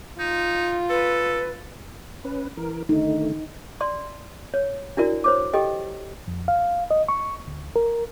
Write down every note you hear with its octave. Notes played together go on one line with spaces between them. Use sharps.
D#4 F4
A4 B4
C#4 B4
E3 A#4
D3 D#3 A3 D#4
D5 C6
C#5
D4 E4 F#4 A#4 D5
C5 C#5 D6
G4 A4 D#5 G5
F2
F5
D#5
C#6
D2
A#4